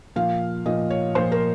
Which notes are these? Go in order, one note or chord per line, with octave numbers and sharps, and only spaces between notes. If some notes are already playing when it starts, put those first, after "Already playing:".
A#2 F3 F5
A#2 F3 D#5
C#5
A#2 F3 C5
A#4